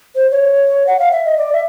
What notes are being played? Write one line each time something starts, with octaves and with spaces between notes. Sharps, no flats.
C5
C#5
F#5
F5
E5
D#5
D5
E5